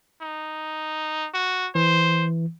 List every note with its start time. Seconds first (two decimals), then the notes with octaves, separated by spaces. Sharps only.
0.22 D#4
1.34 F#4
1.75 E3 C5